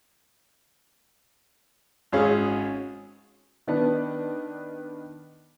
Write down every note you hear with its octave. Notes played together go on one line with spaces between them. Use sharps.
G#1 C#4 G#4 F5
D#3 B3 D4